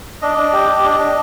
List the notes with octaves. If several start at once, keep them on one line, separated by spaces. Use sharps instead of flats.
D4 D#5
D4
G4
G4
D4
D4